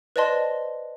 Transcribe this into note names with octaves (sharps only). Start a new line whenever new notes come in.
B4 C5 D5 D#5 A5 C6